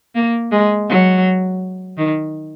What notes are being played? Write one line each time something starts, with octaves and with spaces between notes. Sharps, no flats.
A#3
G#3
F#3
D#3